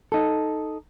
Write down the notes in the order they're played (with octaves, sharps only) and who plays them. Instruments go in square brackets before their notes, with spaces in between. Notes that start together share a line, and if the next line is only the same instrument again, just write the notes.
[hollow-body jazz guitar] D#4 A4